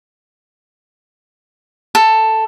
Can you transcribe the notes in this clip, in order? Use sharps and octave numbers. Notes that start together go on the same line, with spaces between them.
A4